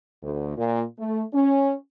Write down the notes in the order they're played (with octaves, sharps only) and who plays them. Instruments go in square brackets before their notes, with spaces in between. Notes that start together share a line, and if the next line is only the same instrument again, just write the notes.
[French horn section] D2
A#2
A3
C#4